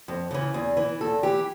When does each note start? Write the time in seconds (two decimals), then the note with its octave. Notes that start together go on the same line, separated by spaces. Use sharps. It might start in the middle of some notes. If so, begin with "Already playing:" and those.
0.08 F2
0.31 C#3 E3
0.54 E2
0.77 E3
1.01 E2 A4
1.23 E3 G4